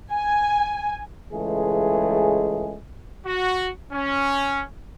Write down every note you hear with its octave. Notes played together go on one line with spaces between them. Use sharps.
G#5
C#2 E3 G#3 A3 G#4
F#4
C#4